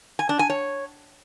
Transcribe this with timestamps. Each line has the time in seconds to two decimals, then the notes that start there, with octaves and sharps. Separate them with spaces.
0.19 G#5
0.29 D4
0.39 G#5
0.50 C#5